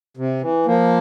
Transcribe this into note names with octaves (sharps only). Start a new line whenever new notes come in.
C3
E3
F3 A#3